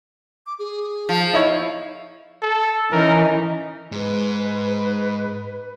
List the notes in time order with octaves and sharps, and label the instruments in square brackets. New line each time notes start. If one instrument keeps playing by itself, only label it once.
[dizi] D6
G#4
[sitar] F3
[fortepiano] D#4 E4 C#5
[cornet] A4
[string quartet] E3 C#4 D#4 [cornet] A#4
[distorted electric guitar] G#2 [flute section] B4